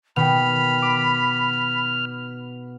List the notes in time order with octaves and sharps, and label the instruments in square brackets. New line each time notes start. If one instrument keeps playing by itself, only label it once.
[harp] B2 D#3 [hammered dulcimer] B3 G5 [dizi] B5 [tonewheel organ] F6
[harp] D6